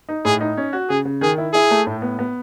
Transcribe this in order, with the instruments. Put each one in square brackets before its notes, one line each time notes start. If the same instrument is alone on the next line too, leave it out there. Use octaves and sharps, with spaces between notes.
[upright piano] D#4
[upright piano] A2 [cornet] G#4
[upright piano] D#4
C#4
F#4
[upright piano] C#3 [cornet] G#4
[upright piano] C#3
[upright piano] D#3 [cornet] G#4
[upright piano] E4
[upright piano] E4 [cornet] G#4
[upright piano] A3
A2
B3
B3